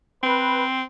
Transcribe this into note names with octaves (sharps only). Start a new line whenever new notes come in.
C4 B4